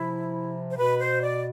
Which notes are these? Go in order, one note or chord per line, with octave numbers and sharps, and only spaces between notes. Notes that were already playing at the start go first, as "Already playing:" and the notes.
Already playing: C3 F3 E4
C5
B2 B4
C5
D5